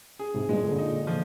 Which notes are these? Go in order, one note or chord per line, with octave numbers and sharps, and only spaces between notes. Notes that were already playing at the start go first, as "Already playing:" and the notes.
G#4
G#2 C3
G2 A#2 G#3
A#2 D3
D#4
F3